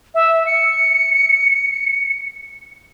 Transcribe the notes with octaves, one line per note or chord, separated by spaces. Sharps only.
E5
C#7